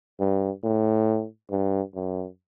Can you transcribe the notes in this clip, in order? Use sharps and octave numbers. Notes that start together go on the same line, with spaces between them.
G2
A2
G2
F#2